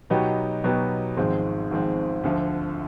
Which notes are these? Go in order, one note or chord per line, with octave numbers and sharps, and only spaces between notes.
B2 F#3 B3 D#4 G4
B2 F#3 B3 D#4 G4
G#1 G#2 F3 G#3 C4
G#1 G#2 F3 G#3 C4
D2 D3 F3